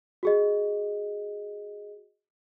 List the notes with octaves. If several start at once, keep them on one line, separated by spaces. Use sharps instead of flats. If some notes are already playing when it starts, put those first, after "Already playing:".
F#4 G#4 D#5